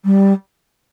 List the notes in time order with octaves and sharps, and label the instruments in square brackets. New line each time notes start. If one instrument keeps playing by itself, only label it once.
[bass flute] G3